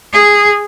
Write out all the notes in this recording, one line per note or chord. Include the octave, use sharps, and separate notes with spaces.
G#4